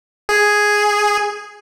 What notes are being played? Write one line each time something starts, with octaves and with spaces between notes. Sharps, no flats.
G#4